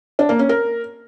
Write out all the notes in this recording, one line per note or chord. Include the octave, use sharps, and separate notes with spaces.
D4
A#3
C#4
A#4